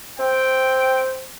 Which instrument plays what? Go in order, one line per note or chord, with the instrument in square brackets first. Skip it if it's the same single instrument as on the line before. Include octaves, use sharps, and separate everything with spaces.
[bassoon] C4 [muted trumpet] G5